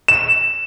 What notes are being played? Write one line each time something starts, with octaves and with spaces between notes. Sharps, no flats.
E7